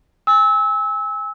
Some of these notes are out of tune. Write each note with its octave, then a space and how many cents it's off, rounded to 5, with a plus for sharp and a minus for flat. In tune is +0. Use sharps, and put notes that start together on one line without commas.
G#5 -25 E6 -25